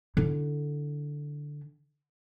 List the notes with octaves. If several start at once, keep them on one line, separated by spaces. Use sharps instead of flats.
D3 E4